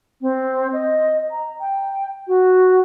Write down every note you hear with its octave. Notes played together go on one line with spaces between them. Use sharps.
C4
D#5
A#5
G5
F#4